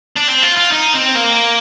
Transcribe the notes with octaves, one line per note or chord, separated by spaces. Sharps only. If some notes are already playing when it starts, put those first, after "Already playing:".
D4
C4
F4
F4
D#4
C4
A#3